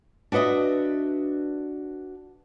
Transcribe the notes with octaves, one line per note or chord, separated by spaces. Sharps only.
D4 F#4 B4 D#5 E5